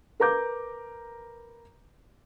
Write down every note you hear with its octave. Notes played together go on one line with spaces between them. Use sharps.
A#4 B4 A#5 D6 G6